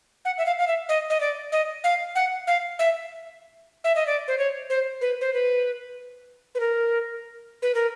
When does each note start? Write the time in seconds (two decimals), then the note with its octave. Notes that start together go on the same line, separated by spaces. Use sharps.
0.25 F#5
0.38 E5
0.46 F5
0.59 F5
0.68 E5
0.89 D#5
1.10 D#5
1.20 D5
1.52 D#5
1.84 F5
2.15 F#5
2.47 F5
2.79 E5
3.84 E5
3.96 D#5
4.07 D5
4.28 C5
4.38 C#5
4.70 C5
5.01 B4
5.21 C5
5.33 B4
6.55 B4
6.60 A#4
7.62 B4
7.75 A#4